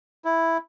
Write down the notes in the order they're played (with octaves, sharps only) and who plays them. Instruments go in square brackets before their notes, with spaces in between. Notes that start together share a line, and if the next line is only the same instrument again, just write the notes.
[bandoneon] E4